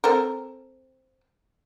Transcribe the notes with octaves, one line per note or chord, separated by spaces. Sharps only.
C4 A4 A#4